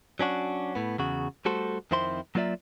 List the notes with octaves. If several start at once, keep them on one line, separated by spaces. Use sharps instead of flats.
F#3 C#4 D4 F#4
A2 B3
E2 C#3 F#4
G3 A3 F#4 A4 C5
F2 D#3 C4 E4 C5 C6
F#3 A#3 F4 D5 E5